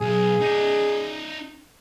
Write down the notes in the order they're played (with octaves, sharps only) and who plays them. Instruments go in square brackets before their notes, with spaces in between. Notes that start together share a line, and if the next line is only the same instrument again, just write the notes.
[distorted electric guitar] B1 [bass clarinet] G#4
[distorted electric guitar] D#4 D5